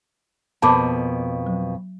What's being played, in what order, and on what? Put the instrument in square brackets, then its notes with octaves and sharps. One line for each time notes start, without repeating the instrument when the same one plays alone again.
[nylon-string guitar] F2 B2 A#3 [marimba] A5 B5 D6
[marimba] F#3